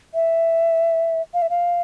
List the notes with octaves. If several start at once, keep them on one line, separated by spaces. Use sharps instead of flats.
E5
F5
E5
F5